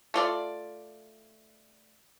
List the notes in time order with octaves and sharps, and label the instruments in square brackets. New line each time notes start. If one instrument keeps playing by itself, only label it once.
[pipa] A3 F4 D5